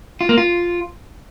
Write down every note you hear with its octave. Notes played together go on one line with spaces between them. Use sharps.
F4
A#3
F4